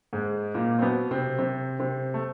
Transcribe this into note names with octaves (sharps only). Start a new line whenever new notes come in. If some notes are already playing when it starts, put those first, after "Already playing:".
G#2 G#3
A#2 A#3
C4
B2 B3
C3 C4
C3 C4
C3 C4
A3